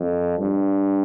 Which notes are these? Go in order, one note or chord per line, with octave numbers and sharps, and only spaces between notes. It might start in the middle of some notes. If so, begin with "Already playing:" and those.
Already playing: F2
G2